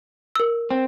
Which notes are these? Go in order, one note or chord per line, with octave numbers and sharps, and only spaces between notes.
A#4 E6
C4